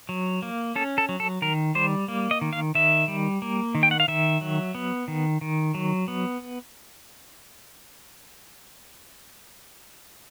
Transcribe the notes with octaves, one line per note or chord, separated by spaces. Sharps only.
F#3
A#3
C#4 A4
A4
F#3
A4
D#3 A#4
G3 C5
A#3
D#5
D#3
F5
D#3 E5
G3
A#3
D#3
G5
F#5
F5
D#3 E5
F#3
B3
D#3
D#3
F#3
B3